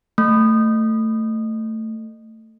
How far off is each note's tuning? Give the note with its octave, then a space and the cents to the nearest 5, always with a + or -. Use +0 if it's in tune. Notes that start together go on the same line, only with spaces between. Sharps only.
A3 +15